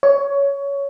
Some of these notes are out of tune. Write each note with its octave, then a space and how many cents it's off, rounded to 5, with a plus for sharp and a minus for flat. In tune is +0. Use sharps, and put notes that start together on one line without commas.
C#5 +15